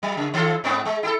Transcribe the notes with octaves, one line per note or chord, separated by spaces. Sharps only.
F#3
C#3
D#3 F4 A4
G#2 B3 C4
G#3
E4 G4 A4